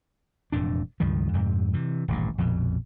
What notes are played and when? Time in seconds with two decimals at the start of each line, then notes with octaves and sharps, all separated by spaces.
0.52 E1 F2 A2 D4
1.00 C#2 G2 D#3 F3
1.33 F2 G#2 C3
1.73 C3 E3
2.08 D#1 A1 G2
2.38 A#1 F2 B2